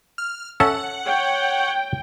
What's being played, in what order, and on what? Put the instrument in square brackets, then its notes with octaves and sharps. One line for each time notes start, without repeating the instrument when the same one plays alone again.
[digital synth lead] F6
[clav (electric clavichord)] C#4 A4 E5 [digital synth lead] F#5
[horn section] C#5 [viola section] G5